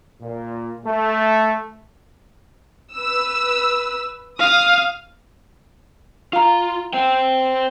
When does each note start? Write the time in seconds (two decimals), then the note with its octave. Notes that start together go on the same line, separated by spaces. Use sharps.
0.21 A#2
0.86 A3
2.95 B4 E6
4.39 F5 D#6
6.33 F4 F5 A#5
6.93 C5 G5